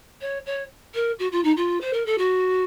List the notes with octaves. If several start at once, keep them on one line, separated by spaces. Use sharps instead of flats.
C#5
C#5
A#4
F#4
F4
D#4
F4
C5
A#4
A4
F#4